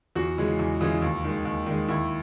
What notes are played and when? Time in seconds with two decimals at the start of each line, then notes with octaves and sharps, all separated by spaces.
0.16 E2 F#4
0.38 C#3 E3 G#3
0.59 E2
0.81 C#3 E3 G#3
1.02 D#2
1.24 D#3 G#3
1.45 D#2
1.66 D#3 G#3
1.88 D#2 E4